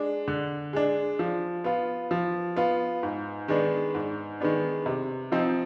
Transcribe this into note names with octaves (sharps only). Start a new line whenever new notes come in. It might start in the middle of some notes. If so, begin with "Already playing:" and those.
Already playing: G#3 D4
D3
G#3 D4
F3
B3 F4
F3
B3 F4
G#2
D#3 G#3 B3 D4
G#2
D#3 G#3 B3 D4
C3
F3 C4 D#4